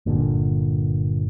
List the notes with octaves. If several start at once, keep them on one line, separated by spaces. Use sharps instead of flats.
G1 A#2 D3